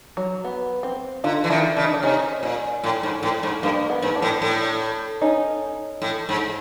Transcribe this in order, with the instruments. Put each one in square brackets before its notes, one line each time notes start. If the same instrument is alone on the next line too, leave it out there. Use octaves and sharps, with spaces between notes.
[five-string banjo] F#3
B3
C4
[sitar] D3 [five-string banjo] D#4 F4
[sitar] E3
[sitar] D#3 [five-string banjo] D4 E4
[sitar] C#3 [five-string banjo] D4
[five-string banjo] D#4
D4
[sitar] C3 [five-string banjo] C#4 D#4
[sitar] A#2
A2
G#2
A2
G#2
[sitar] G2 [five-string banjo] A#3
[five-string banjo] B3
[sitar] G#2
[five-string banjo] D4
[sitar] A2
A2
[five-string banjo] C#4 D#4
[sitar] A2
G#2